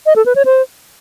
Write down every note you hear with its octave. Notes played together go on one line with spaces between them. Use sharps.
D#5
A4
B4
C#5
C5